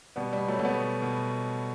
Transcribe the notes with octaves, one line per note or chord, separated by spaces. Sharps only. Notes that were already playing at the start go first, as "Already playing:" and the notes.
B2 G3 B3
B2 G3
F#3 A3
B2 A3
G3 B3
B2
B2